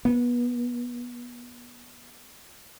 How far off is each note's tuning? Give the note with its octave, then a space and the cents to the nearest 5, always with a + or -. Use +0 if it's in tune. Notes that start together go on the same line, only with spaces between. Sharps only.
B3 -25